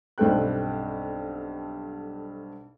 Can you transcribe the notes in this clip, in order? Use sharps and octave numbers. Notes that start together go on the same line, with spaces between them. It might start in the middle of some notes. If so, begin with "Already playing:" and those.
B1 G2 C4 A4 G5 F#6